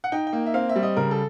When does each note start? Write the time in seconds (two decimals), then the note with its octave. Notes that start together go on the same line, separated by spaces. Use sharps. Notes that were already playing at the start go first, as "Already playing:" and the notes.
0.04 F#5
0.12 D#4 G5
0.27 G5
0.33 A#3
0.46 E5
0.54 C4 F5
0.69 E5
0.76 G3
0.83 D#5
0.97 C#3 A#4
1.11 A4